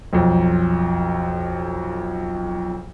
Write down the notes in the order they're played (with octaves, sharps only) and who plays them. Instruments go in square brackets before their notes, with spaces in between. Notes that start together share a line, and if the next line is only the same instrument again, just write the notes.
[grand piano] B1 F2